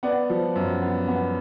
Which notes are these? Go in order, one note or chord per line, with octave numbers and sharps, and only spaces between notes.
B3 D5 F#5
F3
F#2
B3
B3